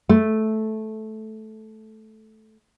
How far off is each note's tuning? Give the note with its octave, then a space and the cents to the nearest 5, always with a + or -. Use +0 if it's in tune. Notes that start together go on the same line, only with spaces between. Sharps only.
A3 -10